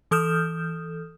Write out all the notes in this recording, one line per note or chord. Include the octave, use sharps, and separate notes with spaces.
E3 A4 D#6 F6 G6 E7